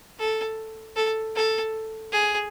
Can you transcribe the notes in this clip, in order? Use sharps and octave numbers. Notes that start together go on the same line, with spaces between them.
A4
A4
A4
G#4